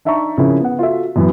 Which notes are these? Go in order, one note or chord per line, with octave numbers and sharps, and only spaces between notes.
D4 D#4 E5 A5 A#5 C#6
C#3 F3 C4 C#4 E4 A#4
B3 F#5
F4 F#4 A4 E5
F#2 E3 F#3 B3